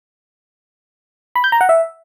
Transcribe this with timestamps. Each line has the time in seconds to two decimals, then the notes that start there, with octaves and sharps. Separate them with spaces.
1.36 B5
1.44 G6
1.52 A#5
1.61 F#5
1.69 E5